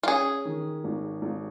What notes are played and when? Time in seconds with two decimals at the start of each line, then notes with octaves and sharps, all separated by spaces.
0.03 F4
0.07 C#4 G#4
0.45 D#3
0.84 G#1
1.22 G#1